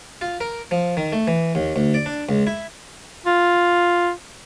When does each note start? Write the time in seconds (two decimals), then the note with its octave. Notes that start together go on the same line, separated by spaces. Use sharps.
0.21 F4
0.41 A#4
0.71 F3
0.97 D#3
1.12 A3
1.27 E3
1.55 D#2
1.76 D2
1.94 D5
2.06 D4
2.29 C#2
2.47 E4
3.26 F4